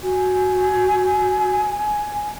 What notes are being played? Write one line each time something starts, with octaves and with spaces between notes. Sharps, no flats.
F#4 G#5